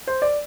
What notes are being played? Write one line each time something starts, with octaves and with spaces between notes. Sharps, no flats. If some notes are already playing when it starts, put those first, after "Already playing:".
C5
D5